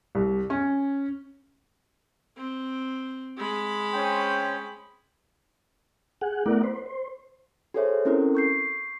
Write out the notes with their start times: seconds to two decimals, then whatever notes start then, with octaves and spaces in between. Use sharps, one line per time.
0.15 C2
0.50 C#4
2.37 C4
3.37 G#3 B5
3.92 C#4 C5 G5
6.21 G#4 F#5
6.46 A3 B3 E4 A#4 D5 F#5
6.64 B4 C5
6.86 C5
7.74 F#4 G#4 A4 C5 C#5 E5
8.05 C4 C#4 E4 F#4 A4 A#4
8.35 C#6 G6 C7